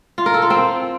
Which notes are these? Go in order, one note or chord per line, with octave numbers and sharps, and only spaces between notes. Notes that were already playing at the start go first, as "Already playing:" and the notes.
F4
A#4
A4
F4
C4